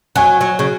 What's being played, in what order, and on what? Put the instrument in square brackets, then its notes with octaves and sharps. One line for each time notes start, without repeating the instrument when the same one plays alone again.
[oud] F#3 [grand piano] G#5
[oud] F#3
C#3